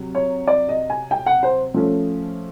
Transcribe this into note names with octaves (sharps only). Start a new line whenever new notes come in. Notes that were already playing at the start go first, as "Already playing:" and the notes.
Already playing: C3 F#3
C#5
D5
D#5
G#5
G5
F#5
C5
F3 A3 C#4